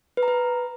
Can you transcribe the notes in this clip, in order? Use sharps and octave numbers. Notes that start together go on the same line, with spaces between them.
B4
A#5
B4